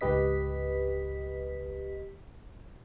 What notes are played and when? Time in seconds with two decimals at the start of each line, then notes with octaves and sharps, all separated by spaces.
0.01 C#2 G#2 G4 B4 D#5 B6